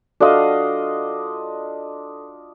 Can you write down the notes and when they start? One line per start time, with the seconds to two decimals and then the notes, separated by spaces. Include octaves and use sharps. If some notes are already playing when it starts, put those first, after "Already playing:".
0.20 D4 F4 F#4 A4 D#5 F5